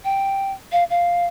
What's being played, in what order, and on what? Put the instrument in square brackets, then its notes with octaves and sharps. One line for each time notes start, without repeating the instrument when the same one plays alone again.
[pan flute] G5
F5
F5